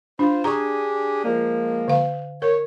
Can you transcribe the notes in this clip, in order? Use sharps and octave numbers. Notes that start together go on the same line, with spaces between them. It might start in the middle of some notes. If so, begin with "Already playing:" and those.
D4 F4 C5
D4 G4 G#4 A#5 C#6
F3 G#3 A#3
D3 F5
A#4 C#5